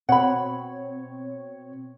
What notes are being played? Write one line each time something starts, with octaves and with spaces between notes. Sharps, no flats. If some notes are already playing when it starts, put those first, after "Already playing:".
B2 C4 C#5 F#5 B5